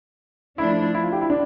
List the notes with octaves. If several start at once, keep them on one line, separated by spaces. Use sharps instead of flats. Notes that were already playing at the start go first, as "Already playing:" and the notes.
F3 A3 D4 E4
E4
F4
G4
E4
D4